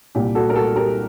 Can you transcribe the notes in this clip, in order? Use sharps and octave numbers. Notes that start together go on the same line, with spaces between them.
C2 A#2 G3 G4
F#4 A4
A#4
F#4 A4
G4 A#4